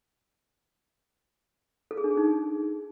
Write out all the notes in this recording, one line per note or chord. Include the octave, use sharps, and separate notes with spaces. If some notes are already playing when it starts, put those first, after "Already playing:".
A4
G#4
D4
G#4
D#4